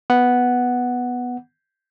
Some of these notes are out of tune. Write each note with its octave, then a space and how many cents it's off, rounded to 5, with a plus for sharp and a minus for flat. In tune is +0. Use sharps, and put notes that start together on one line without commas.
B3 +0 F#5 +0